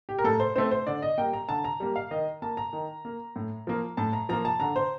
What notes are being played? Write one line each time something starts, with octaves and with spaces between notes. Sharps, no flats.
G4
A#4
A2 A4
C5
A3 C4 C5
C5
D3 D5
D#5
G3 A#3 G5
A#5
D3 A5
A#5
G3 A#3
F5
D#3 D#5
A#3 A5
A#5
D#3
A#3
A2
F3 A#3
A2 A5
A#5
F3 A#3 A#5
A5
D3 A#5
C5